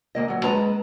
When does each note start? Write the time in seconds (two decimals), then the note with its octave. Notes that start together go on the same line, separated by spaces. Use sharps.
0.15 D2 A#3 D#5
0.28 D2 F#3
0.44 G#3 B4 A5 A#5